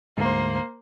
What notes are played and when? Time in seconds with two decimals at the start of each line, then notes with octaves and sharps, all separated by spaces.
0.17 D2 G#2 A#3 C5